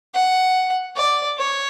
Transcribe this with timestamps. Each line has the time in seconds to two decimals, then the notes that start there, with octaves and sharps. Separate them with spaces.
0.14 F#5
0.96 D5
1.38 C#5